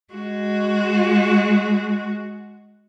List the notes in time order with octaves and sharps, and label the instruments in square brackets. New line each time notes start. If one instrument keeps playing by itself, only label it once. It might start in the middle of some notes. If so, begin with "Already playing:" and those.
[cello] G#3 F#4